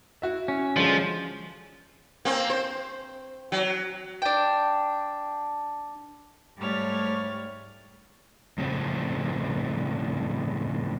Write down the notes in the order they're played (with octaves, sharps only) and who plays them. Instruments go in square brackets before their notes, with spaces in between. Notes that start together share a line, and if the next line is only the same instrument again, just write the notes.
[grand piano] E4 F#4 E5
[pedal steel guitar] C#4
[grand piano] D3 G#3 A4 [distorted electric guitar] F3
[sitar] A#3 C4
C5
F#3
[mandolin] D4 G5
[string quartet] G#2 G3 A3 C#5 F6 A6
[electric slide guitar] F2 A2 C#3 C4